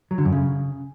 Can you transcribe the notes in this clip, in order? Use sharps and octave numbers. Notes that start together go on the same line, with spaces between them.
F#3
D3
F#2
C#3